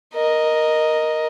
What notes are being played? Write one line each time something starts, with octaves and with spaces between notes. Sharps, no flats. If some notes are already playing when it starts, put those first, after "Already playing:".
A#4 D#5